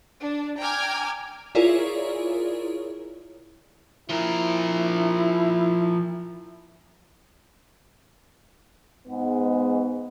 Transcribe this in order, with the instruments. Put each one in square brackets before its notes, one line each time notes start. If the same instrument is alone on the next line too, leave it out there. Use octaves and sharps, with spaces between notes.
[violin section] D4
G5 G#5 A#5 D6 F6 G#6
[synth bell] E4 F4 G#4 A#4 C#5 D5
[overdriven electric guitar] F3 A#4 [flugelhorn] E4
[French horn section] G#2 G#3 B3